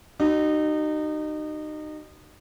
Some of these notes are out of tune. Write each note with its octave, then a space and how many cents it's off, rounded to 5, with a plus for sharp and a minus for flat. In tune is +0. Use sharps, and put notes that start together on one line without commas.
D#4 -25 F#4 +45